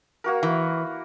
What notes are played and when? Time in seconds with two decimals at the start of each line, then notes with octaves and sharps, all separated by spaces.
0.24 A#3 F#4 A#4
0.43 E3